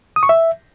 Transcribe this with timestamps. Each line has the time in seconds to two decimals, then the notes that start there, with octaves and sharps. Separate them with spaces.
0.16 D#6
0.23 C#6
0.29 E5